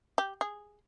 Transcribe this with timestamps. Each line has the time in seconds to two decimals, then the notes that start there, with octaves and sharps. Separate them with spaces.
0.18 G4
0.41 G#4